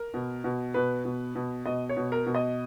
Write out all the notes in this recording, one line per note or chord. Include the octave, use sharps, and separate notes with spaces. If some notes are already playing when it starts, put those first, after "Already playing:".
Already playing: A#4
B2
B2
B2 B4
B2
B2
B2 D#5
C#5
B2
A#4
B2
D#5